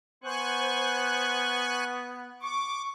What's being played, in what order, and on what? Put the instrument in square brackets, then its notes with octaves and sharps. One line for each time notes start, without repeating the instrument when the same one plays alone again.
[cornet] B3 [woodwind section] C5 [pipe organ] G#5 C#6 F#6
[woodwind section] C#6 [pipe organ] D6